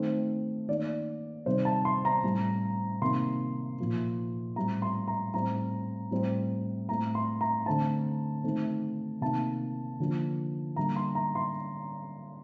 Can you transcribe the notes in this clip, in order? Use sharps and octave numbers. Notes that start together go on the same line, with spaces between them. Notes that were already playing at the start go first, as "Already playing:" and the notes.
Already playing: D#3 A3 C4
D#3 A#3 D5
C3 D#3 G3 C5
A5
C6
A#5
A2 G3 C4
C3 D#3 A#3 C6
A#2 F3 A#3
A2 G3 C4 A#5
C6
A#5
A2 G3 C4 A#5
A2 G3 C4
A2 A3 C4 A#5
C6
A#5
D3 A3 C4 A5
D#3 A3 C4
C3 D#3 A#3 A5
D3 F3 A#3
D3 G3 A#3 A#5
C6
A#5
C6